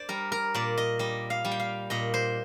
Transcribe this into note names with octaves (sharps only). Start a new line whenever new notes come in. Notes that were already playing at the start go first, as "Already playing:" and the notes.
Already playing: C5 D5
G3 A#4
A#4
A#2 D5
D#5
G3 D#5
F5
G3
G5
F5
A#2 D#5
C5